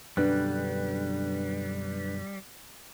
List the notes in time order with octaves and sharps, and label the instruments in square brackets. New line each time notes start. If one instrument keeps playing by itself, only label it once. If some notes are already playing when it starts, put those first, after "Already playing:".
[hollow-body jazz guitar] F#2 B2 D3 [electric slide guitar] G3 [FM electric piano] D4 B4 F#6